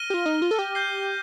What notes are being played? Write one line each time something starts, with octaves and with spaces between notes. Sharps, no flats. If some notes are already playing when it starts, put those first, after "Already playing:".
Already playing: F6 A#6 D#7 G7
G4
F4
D#4
F4
A4
G4
G6 C7 G7